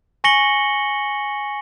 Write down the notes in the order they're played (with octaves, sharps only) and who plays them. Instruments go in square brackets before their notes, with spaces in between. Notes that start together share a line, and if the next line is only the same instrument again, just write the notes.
[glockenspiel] G#5 C#6 A#6 C#7 F#7 G7